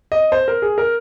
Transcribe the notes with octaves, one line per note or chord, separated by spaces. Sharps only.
D#5
C5
A#4
G#4
A#4